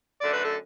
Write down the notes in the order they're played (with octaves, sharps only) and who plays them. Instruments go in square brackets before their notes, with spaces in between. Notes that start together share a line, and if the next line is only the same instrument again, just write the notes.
[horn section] F#2 D3 A3 [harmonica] D5
[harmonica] B4
A4